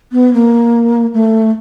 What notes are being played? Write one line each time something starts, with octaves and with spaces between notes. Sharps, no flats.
B3
A#3
A3